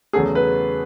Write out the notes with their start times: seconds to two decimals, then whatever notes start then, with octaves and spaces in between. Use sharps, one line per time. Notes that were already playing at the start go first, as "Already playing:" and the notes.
0.13 E2 C#3 F#3 A3 G#4
0.35 B4